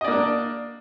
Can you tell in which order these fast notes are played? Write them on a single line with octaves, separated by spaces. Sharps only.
D#5 D5 A#3 D4